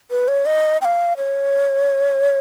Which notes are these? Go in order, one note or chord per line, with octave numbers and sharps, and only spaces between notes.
B4
C#5
D#5
G5
F5
C#5